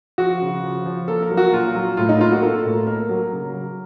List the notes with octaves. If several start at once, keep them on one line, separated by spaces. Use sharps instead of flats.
F3 F#4
C#3
F3
F3
A#3 A4
A#4
F#3
F#4
A#2 F4
F#3
A2 F4
D#4
A#3 F4
F#4
A#3 A4
A2
A#3 A#4
F#3
C#3
F#3